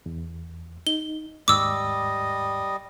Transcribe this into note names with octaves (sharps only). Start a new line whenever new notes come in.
E2
D#4 G7
D#2 G#2 G3 D#5 D6 E6